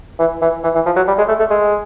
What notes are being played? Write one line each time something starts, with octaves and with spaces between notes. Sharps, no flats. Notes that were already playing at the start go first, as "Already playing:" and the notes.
E3
E3
E3
E3
F3
F#3
G3
G#3
A3
A3
G#3